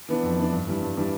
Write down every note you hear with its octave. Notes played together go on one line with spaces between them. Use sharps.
E3 B3 D4
F2
E3 B3 D4
G2
E3 G3 D4
G2
E3 G3 D4